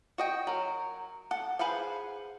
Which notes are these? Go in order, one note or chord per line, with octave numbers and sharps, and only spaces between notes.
F#4 D#5 G5
F#3 A#4
A4 F#5
G#4 B4 C5 F5 F#5